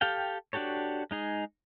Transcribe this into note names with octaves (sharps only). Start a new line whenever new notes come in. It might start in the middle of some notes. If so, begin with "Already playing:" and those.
G4 A4 F5 G5
D4 F#4 G4 A4 C#5
G#3 D#4 G#4